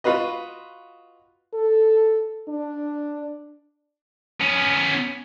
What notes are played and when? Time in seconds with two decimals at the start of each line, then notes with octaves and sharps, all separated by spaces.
0.04 F4 F#4 B4 D#5
1.54 A4
2.48 D4
4.41 B3 C#4